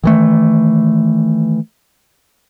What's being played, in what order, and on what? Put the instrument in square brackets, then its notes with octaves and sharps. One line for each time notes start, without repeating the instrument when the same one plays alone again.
[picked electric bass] D#3 E3 A3